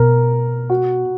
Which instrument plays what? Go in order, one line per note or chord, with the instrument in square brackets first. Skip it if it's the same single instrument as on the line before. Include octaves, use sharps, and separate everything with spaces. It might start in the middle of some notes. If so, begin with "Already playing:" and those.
Already playing: [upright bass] B2 [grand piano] A#4
[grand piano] F#4